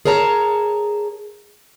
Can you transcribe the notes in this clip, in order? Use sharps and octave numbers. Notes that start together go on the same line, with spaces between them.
G#4 A#4 C#5 A5 A#5